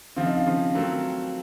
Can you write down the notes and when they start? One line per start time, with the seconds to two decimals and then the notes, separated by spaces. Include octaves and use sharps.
0.16 C#3 F3 C4 F4
0.26 D#4
0.37 F4
0.46 C#3 F3 C4
0.75 D#3 F#3 A3 C4